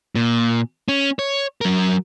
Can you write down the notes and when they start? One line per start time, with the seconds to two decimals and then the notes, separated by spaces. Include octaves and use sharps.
0.15 A#2
0.88 C#4
1.19 C#5
1.61 F#3 A#4